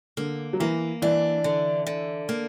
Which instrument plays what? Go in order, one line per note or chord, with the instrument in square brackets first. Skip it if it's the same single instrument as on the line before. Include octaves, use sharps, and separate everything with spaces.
[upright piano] D3 [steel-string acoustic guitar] A#3
[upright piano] F#3
[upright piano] E3 [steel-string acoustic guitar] A#3
[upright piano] E3 [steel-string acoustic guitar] D4
[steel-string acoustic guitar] D3
D3
A#3